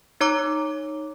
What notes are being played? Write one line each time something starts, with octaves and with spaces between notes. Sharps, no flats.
D#4 C#5 A#5 D6